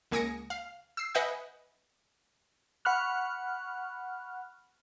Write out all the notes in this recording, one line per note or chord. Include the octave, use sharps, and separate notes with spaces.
C#2 A#3 G#5 D#6 A#6 C#7
F5
E6 C7
B4 D#5 E5 F#5 G#5 G6
F#5 B5 C#6 F6 F#6